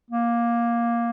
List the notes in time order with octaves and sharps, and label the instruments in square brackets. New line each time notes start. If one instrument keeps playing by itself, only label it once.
[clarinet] A#3